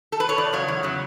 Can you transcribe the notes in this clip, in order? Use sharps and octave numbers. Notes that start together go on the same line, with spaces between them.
A4
B4
C#5
E2 D5
C#3 F#3 C#5
E2
C#3 F#3